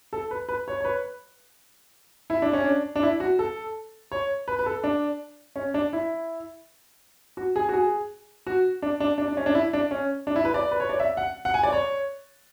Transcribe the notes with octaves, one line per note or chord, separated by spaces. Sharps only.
A4
B4
B4
C#5
C#5
B4
E4
D4
C#4
D4
D4
E4
F#4
A4
C#5
B4
B4
A4
D4
C#4
D4
E4
F#4
G#4
F#4
G#4
F#4
D4
D4
D4
D4
C#4
D4
E4
D4
C#4
D4
E4
B4
D5
B4
C#5
D5
E5
F#5
F#5
G#5
D5
C#5